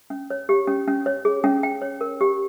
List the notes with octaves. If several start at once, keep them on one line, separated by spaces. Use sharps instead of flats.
C#4
C#5
G4
C#4
C#4
C#5
G#4
C#4
G5
C#5
A#4
G4